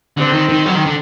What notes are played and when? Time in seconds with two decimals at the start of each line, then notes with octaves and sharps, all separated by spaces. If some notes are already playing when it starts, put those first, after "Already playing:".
0.17 D3 C4
0.33 D#3
0.49 D#3
0.66 F#3
0.75 D#3
0.86 D3